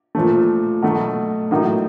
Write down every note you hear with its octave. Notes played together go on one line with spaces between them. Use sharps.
A#2 F3 A3
B2 F#3 A3
A2 F#3 A#3 D#4